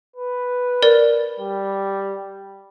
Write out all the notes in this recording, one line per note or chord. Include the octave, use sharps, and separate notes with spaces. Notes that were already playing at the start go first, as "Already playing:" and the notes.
B4
A#4 D5
G3